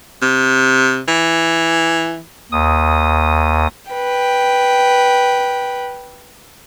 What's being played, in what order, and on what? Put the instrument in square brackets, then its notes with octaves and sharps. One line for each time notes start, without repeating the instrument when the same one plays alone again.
[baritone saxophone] C3
E3
[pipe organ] D#2 D#6
[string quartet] B4 G5